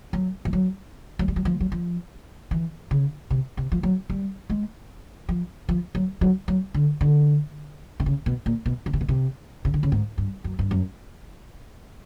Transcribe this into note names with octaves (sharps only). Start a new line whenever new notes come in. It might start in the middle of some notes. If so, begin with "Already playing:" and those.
F#3
F3
F#3
F#3
G3
F#3
F3
F#3
F3
E3
C#3
C3
C3
F3
F#3
G3
G#3
F3
F3
F#3
F#3
F#3
D3
D3
C3
C#3
B2
A#2
B2
C#3
C3
B2
C3
C#3
D3
C#3
G#2
G2
F#2
G2
F#2